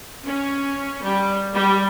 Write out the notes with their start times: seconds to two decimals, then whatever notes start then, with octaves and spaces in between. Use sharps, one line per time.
0.25 C#4
1.02 G3
1.55 G3